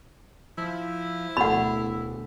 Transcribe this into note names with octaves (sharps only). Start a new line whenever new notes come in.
F3 E4
D1 B2 A3 F#5 B5